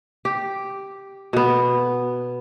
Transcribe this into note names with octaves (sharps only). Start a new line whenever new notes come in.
G4
B2 B3